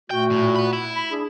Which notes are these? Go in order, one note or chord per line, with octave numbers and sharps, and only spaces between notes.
A#2 A3 F#4 G5
A2
F#5 B5
E4
B5
D4 G#4